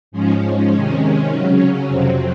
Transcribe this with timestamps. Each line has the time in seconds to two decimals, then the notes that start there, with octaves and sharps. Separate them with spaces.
0.12 G#2 F3 G#3 C#4
0.71 C3 D#3 G#3 C#4
1.30 C#3 F#3 C#4
1.89 F2 C3 F#3 C4